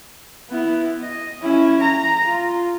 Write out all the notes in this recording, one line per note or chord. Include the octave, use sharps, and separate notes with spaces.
B3 E4
D#5
C#4 E4
A#5
F4